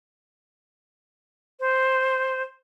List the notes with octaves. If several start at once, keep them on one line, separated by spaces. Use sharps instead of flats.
C5